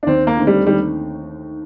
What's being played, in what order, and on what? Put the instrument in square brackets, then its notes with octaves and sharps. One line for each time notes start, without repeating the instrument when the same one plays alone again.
[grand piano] D4
[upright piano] D#2 [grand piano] C4
[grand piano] A#3
[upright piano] D3 A3 C4 D#4
[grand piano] G3
[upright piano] D#2 [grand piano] G3